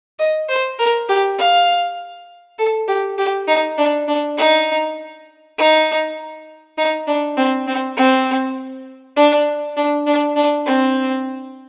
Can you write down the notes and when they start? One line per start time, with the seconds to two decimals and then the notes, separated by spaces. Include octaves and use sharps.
0.19 D#5
0.49 C5
0.79 A#4
1.09 G4
1.39 F5
2.59 A4
2.88 G4
3.18 G4
3.48 D#4
3.78 D4
4.08 D4
4.38 D#4
5.58 D#4
6.78 D#4
7.07 D4
7.37 C4
7.67 C4
7.97 C4
9.17 D4
9.77 D4
10.07 D4
10.36 D4
10.66 C4